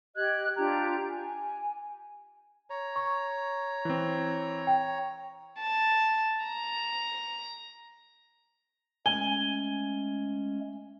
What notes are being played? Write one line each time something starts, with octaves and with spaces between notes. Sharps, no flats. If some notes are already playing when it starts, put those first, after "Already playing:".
G4 D#5 F#6 G#6
D4 F4 G4 A#5
G#5
C#5 A#5
C#6
E3 C4
G5
A5
A#5
G#3 A3 C#4 G#5 G7